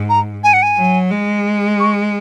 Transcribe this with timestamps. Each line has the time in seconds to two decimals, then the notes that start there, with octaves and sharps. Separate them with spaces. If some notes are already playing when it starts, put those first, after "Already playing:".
Already playing: G#2
0.09 A#5
0.44 G#5
0.53 F#5
0.63 G#5
0.78 F#3
1.11 G#3
1.80 C#6